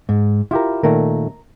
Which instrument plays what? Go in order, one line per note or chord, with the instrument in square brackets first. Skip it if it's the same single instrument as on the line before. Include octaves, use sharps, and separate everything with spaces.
[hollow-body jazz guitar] G#2
[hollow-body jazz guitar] E4 [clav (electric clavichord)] F4 G4 A#4
[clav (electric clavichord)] A#2 D#3 A3 [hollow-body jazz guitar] A#4